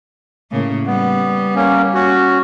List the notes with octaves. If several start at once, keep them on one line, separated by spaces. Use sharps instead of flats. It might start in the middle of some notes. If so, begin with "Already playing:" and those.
A2 C#3 A#3
G3 B3
A#3 C#4
C#4 F#4